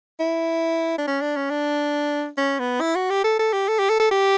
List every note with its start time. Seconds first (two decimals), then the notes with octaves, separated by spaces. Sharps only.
0.20 E4
0.98 D4
1.07 C#4
1.21 D4
1.36 C#4
1.50 D4
2.38 C#4
2.59 B3
2.81 E4
2.95 F#4
3.10 G4
3.24 A4
3.39 A4
3.53 G4
3.68 A4
3.79 G4
3.90 A4
4.00 A4
4.11 G4